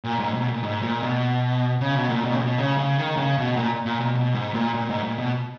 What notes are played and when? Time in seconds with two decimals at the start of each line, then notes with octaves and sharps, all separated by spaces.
0.04 A#2
0.19 G#2
0.34 B2
0.48 A#2
0.63 G#2
0.83 A#2
1.02 B2
1.81 C#3
1.95 B2
2.09 A#2
2.24 B2
2.33 C#3
2.39 B2
2.59 C#3
2.78 C#3
2.98 D#3
3.17 C#3
3.38 B2
3.57 A#2
3.86 A#2
4.00 B2
4.15 B2
4.35 G#2
4.54 A#2
4.74 A#2
4.89 G#2
5.03 A#2
5.18 B2